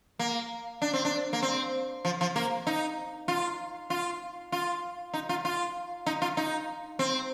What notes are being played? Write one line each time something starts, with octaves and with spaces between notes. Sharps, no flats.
A#3
D4
C4
D4
A#3
C4
F3
F3
A#3
D#4
F4
F4
F4
D#4
F4
F4
D#4
F4
D#4
C4